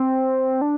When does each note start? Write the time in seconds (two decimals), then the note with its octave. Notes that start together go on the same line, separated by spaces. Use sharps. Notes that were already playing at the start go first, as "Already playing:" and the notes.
Already playing: C4
0.61 D4